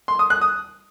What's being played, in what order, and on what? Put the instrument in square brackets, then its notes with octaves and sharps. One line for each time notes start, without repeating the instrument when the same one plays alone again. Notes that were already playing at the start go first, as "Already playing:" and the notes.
[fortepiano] C6
D#6
F#6
D#6